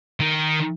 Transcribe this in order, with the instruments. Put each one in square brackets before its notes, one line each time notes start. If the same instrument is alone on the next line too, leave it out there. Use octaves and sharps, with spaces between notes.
[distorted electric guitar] D#3